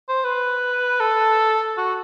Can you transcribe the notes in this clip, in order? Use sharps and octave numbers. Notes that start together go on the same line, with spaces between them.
C5
B4
A4
F#4